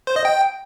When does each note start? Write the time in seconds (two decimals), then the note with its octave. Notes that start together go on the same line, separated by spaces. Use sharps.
0.07 C5
0.16 D#5
0.25 G5